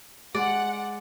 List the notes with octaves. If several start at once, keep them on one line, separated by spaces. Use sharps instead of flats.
G#3 D5 F#5